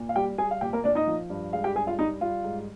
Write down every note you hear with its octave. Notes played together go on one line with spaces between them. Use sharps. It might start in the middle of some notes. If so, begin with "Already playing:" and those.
Already playing: A#2
F5
G3 G4 G5
G3 G#4 G#5
F5
A#2 G4 G5
A#3 A#4
A#2 D4 D5
D#4 D#5
F3
G2
G#3 F5
G4 G5
G2 G#4 G#5
F4 F5
G3 D#4 D#5
G3 F4
G#2